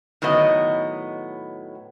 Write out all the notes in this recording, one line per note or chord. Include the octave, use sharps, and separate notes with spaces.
A2 D#3 F#3 B3 D#5